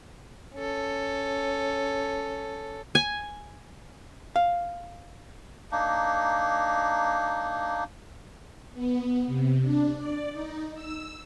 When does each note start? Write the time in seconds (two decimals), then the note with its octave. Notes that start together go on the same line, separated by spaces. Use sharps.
0.55 C#4 A4
2.95 G#5
4.36 F5
5.72 A#3 D4 D#4
8.74 B3
9.27 C3
9.62 D4
9.96 D5
10.33 D#4
10.74 E6